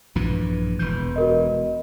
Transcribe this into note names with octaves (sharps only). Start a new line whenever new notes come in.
A#1 G2 E3 F4
E1 E3 G6
F#4 A#4 D#5